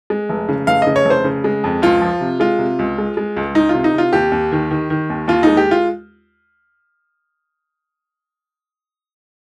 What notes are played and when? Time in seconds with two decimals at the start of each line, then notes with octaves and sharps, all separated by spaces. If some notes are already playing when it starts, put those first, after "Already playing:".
0.10 G#3
0.29 F1
0.49 C#3
0.67 F1 F5
0.82 C#3 D#5
0.96 C#5
1.05 F1
1.10 C5
1.24 C#3
1.44 G#3
1.64 F2
1.82 C#2 F4
2.01 F3
2.21 C3
2.40 G#3 F4
2.59 C3
2.79 C#2
2.98 G#3
3.17 G#3
3.37 C#2
3.55 C#2 D#4
3.69 F4
3.74 C3
3.84 D#4
3.94 C3 F4
4.13 D#2 G4
4.32 D#2
4.52 D#3
4.71 D#3
4.90 D#3
5.10 D#2
5.28 D#2 F4
5.43 G#3 D#4
5.57 G4
5.71 F4